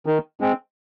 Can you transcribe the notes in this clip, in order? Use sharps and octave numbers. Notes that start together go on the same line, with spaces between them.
D#3
G#3 C4